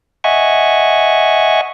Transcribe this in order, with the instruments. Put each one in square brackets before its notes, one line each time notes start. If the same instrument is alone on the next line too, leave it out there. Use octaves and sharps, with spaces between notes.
[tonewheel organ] D#5 E5 F#5 G#5 C#6